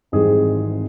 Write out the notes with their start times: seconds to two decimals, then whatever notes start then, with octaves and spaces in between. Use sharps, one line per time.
0.12 G#1 G#2 E3 G3 C4 G#4